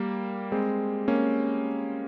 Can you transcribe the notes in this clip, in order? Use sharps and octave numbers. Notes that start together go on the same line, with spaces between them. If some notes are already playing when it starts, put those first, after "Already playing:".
Already playing: G3 A#3
G#3 C4
A#3 C#4